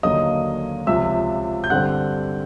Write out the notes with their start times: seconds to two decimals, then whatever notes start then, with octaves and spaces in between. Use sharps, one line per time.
0.03 D#2 D3 F#3 A#3 D#5 D#6
0.87 C#2 C3 F3 E5 E6
1.64 G6
1.70 G2 D3 G3 C4 F#5 F#6